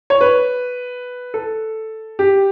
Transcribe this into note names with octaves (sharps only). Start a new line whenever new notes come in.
C#5
B4
A4
G4